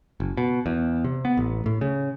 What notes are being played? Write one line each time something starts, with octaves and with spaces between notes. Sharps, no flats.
F#1
B2
E2
C3
B3
A1
A2
C#3